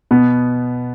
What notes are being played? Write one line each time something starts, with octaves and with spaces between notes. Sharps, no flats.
B2 B3